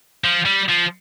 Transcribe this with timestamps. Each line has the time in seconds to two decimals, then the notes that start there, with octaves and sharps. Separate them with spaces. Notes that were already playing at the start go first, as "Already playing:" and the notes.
0.24 F3
0.46 G3
0.69 F3